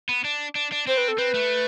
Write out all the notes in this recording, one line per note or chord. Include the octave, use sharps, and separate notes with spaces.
B3
D4
D4
D4
C4 C5
B4
A4
C4 B4
A3